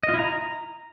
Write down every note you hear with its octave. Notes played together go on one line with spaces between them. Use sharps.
D#5
F4
E4
A#5